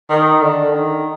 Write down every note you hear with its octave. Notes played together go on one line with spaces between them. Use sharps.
D#3
D3
D#3